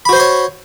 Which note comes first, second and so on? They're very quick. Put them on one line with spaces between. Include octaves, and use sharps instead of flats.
B5 F#4 C5 C6 C#5